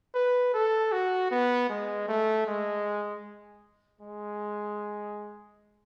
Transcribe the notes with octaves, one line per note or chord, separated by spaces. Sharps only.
B4
A4
F#4
B3
G#3
A3
G#3
G#3